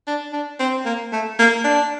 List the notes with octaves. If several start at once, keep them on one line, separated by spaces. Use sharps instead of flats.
D4
D4
C4
A#3
A3
A#3
D4